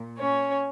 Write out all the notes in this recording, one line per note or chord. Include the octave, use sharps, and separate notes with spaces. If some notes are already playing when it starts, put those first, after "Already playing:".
Already playing: A#2
C#4 C#5